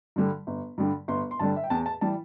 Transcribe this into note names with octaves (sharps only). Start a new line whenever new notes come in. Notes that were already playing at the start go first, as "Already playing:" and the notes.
G2 D3 G3
G1
G2 D3 G3
G1 C6
C6
G2 D3 G3 A5
E5
G5
E2 A5
A5
E3 G3 A5